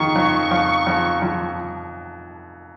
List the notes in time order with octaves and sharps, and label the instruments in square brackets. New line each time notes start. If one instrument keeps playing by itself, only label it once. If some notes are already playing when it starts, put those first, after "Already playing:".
Already playing: [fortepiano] F2 D#3 [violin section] C#6
[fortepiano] F2
F2
F2
F2